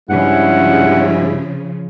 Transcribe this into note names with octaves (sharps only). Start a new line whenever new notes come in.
G2 C#3 F3 G#3 C#4 E4 F#5